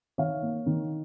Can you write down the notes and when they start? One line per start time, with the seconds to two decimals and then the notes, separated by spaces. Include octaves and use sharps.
0.18 D#3 C#5 F5
0.42 A#3
0.66 D#3